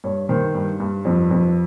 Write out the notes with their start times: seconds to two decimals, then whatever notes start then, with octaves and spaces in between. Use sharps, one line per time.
0.04 G2 C#5
0.29 D#3 C5
0.55 G2
0.80 G2
1.05 F2
1.31 F2